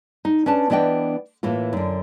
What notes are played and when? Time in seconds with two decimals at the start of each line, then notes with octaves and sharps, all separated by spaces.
0.25 D#4
0.46 C#4 D4 B4 A5
0.70 E3 B3 D4 D#5 G5
1.43 A2 E3 A#3 F4
1.73 F#2 D3